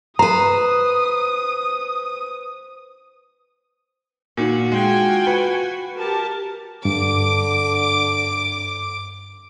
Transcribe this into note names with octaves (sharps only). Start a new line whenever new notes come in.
B4 C5 A#5 D#6
A#2 D#3 F#4
G#3 F4 G5 G#5
B4
G4 A#4 A5
G2 D3 D6